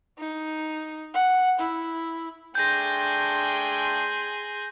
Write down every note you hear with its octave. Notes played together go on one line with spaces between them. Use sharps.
D#4
F#5
E4
A3 D4 G#4 G5 C6 G6 A#6